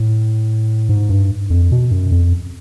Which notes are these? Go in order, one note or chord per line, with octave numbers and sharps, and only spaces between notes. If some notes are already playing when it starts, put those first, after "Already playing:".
Already playing: A2
G#2
G2
F2
B2
F#2
F2